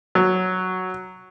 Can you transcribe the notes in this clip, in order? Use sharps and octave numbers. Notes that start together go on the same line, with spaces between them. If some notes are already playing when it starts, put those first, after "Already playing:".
F#3